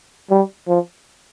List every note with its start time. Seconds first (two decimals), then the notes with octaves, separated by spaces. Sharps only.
0.30 G3
0.67 F3